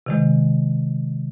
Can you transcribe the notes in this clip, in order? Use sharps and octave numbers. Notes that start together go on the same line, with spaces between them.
C3 D#3 G#3